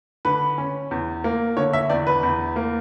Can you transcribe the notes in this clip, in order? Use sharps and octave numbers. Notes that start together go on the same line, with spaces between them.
D3 B4
C#4
E2
A#3
D3 C#5
E5
E2 D5
B4
E2
A#3